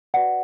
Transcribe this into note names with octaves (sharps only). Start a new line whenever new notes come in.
F#4 B4 D5 F#5